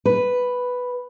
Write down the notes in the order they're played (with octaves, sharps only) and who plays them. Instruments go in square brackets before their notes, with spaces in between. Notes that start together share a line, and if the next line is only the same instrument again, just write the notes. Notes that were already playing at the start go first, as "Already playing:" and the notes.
[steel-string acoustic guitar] B4